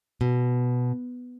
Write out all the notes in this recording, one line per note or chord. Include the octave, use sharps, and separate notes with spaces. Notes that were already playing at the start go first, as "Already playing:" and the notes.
B2